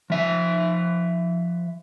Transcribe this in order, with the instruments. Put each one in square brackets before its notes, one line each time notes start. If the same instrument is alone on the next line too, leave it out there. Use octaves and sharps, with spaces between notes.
[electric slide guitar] F3 E5